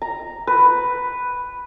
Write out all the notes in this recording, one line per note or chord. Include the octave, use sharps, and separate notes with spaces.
A#5
B4